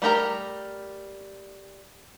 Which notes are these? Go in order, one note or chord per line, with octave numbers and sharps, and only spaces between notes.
G3 A3 G4 A#4 A#5